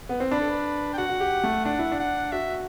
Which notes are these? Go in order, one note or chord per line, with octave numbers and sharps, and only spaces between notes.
B3
C4
D4 B4
A4
B4
G5
F#4 F#5
F#4
G4
A3
D4 F#5
E4
D4
F#5
F#4 E5